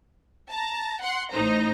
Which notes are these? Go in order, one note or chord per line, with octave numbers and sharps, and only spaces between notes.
A5 A#5
F#5 C6
A1 A2 D#4 C5 A#5